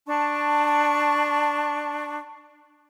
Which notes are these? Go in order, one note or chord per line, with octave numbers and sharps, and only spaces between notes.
D4 A5 C#6